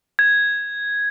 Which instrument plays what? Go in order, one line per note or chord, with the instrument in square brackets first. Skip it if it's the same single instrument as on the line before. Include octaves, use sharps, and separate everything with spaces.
[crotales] G#6